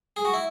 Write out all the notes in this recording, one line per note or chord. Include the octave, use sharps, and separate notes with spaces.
G#4
F#4
E4